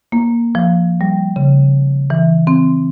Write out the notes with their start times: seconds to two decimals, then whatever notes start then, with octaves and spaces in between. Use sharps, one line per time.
0.12 A#3
0.55 F3
1.01 G3
1.36 C#3
2.10 E3
2.47 C4